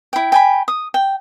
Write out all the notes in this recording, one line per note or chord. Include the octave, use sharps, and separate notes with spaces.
E4 G5
G5 G#5 B5
D#6
G5